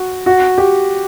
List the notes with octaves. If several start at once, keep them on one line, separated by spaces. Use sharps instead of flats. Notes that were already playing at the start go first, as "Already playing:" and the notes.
Already playing: F#4
F#4
G4